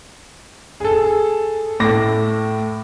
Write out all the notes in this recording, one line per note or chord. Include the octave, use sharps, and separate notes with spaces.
G#4 A4
A2 A4 D6 A#6